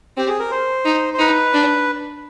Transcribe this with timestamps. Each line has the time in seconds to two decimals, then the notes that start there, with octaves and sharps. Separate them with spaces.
0.17 C4 G4
0.29 G#4
0.39 A#4
0.51 C5
0.85 D#4
1.14 C5
1.19 D#4 B4
1.54 D4